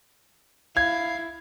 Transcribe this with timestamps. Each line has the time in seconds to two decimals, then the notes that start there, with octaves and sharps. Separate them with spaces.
0.77 E4 F5 G#6